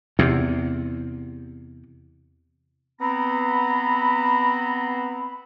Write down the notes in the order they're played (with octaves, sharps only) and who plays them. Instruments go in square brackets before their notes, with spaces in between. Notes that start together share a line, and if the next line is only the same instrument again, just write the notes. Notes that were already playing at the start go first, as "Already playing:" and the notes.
[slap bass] E2 C3
[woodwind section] B3 C4 A#5 [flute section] B5